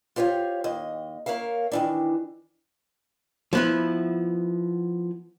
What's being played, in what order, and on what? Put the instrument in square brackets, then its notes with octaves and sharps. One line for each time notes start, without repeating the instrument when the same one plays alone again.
[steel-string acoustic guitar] F4 G4 C5 C#5 F5
D#2 D#5
A#3 A#4 C#5 E5 F5
D#3 E3 D4
[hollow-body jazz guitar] F3 B3 E4